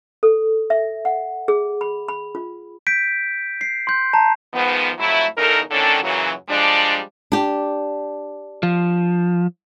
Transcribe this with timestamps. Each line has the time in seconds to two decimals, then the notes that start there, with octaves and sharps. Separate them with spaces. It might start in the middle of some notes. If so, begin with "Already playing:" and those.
0.23 A4
0.70 E5
1.05 F#5
1.48 G#4
1.81 B5
2.09 B5
2.35 F4
2.87 G6 B6 D7
3.61 C7
3.87 C6 G6
4.13 A5 A#5
4.54 G#2 D#3 F3 B3
4.98 F2 F#3 A3 E4
5.36 E2 C#3 D#4 A4 A#4
5.70 A2 D3 D#3 C#4 D4 A4
6.02 F#2 A#2 C#3 E3 F#3
6.49 F3 G3 G#3 D4
7.32 D4 G4
8.63 F3